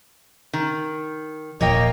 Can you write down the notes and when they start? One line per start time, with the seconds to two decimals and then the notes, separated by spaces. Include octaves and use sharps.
0.53 D#3
1.61 D#1 A#2 F3 A#3 C#5 D#5 G5